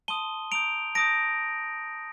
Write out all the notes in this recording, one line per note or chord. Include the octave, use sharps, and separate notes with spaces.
A5 C6 D#6 D#7 G7
A#5 D#6 G6 D7 F7
A5 D#6 G6 A#6 D7